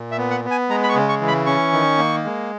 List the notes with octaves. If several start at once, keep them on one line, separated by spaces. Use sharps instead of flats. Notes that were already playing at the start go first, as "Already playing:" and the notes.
Already playing: A#2
E5
B3
F#5
B3
G#5
G#3 A#5
B5
C#6
C#3
C#6
E3
B5
C#4 C#6
D#3
A#3
G#3